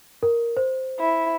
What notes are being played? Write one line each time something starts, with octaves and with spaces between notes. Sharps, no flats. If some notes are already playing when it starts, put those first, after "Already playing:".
A#4
C5
E4